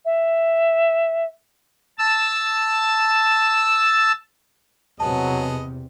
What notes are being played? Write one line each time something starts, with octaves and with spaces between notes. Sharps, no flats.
E5
A5 E6
E2 C3 F#3 B3 G#4 D#5 A5